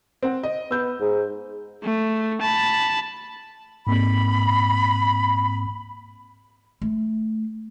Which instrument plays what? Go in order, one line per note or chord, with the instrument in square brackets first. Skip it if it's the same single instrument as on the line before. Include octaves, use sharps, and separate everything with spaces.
[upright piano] C4 F#5
D#5
[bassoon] B3 [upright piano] E6 G6
[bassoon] G#2
[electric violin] A3
A5 B5
[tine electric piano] G#2 A#3 C4 [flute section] B5
[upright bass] A3